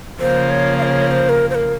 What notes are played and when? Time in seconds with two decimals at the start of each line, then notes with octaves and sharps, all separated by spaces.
0.20 C#3 F3 A#3 F4 C5
0.50 C#5
0.78 F5
0.83 C#5
1.07 C#5
1.11 C5
1.29 A#4
1.50 C5
1.55 A#4